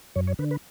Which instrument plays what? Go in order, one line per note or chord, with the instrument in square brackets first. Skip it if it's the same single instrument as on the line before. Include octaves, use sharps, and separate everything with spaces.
[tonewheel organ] F#2 C#5
C#5
D3 B4
B4